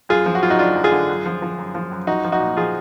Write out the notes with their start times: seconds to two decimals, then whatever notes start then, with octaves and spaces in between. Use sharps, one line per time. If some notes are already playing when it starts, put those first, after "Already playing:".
0.09 F#2 F4 G#4
0.26 F3
0.35 F#4
0.43 F#2 F4
0.50 D#4 F#4
0.59 F#2 D4 F4
0.75 F#2
0.84 F4 G#4
0.92 D3
1.09 F#2
1.26 F3
1.42 F3
1.58 F#2
1.75 F3
1.92 F#2
2.07 F3 D#4 F#4
2.25 F3
2.32 D#4 F#4
2.40 A#2
2.57 F3 F4 G#4